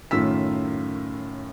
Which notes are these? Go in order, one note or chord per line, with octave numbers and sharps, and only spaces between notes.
F#2 A2 D#3 F4 E6 B6